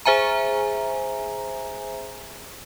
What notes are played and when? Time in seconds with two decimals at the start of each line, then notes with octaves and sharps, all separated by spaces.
0.06 G#4 C5 E5 G#5 A#5